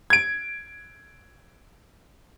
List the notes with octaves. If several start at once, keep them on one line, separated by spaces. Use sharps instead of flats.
G#6 D7